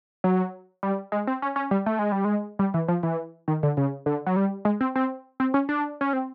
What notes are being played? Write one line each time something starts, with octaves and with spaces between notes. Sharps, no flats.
F#3
G3
G#3
C4
C#4
C#4
G3
A3
G#3
G3
G#3
G3
E3
F3
E3
D#3
D3
C#3
D3
F#3
G3
G#3
C4
C4
C4
C#4
D4
C#4
C4